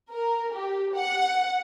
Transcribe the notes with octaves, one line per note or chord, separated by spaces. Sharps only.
A#4
G4
F#5